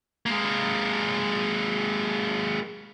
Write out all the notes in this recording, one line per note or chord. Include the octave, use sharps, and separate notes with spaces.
G#3 A#3